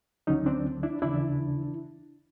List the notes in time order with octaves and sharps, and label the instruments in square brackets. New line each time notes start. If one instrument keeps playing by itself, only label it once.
[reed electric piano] D2 D3 F#3 C#4 D#4
C4 D4
D4 E4
D#2 C#3 E3 D4 E4